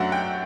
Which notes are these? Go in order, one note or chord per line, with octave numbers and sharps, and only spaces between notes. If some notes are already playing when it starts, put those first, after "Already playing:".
Already playing: F#2 F#3 A3 D4 F#5
G5